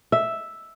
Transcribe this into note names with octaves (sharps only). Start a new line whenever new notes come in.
E5